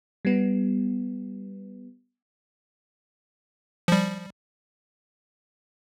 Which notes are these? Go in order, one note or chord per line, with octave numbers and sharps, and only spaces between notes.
G3 B3
F3 G3